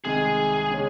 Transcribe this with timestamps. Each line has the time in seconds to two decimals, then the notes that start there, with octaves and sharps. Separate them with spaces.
0.05 C2 C3 D#3 G#3 G#4
0.71 C#3 G#3 C#4